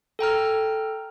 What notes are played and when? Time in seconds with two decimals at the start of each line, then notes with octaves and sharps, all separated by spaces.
0.19 A4 G5 A#5 F6